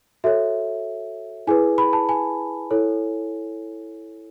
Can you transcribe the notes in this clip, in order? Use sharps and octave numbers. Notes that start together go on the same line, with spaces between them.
F#4 A4 C#5 E5
E4 G#4 B4 G#5
B5
A5
G#5
E4 A4 C#5